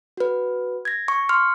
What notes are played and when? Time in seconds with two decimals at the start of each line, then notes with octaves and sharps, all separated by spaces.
0.17 F#4 B4
0.85 G#6 A#6
1.08 C#6
1.29 C6 F6 C#7